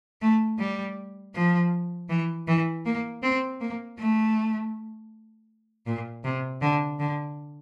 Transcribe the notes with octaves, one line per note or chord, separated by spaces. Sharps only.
A3
G3
F3
E3
E3
A#3
C4
A#3
A3
A#2
C3
D3
D3